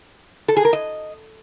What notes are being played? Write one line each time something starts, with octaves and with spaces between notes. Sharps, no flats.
A4
G#4
A#4
D#5